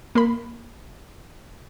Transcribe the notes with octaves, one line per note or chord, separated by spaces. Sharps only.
A#3 A#4 B5